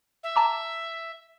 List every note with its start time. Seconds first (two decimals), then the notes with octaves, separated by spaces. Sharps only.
0.23 E5
0.36 A5 A#5 D6